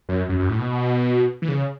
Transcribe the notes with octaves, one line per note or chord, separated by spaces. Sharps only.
F#2
F#2
F#2
A2
B2
E3
C#3